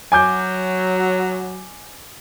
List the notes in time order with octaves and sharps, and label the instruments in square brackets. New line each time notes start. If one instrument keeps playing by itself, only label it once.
[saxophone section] F#3 [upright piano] G#5 D6 G6